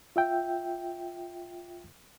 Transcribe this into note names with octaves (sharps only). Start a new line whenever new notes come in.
F4 E5 G5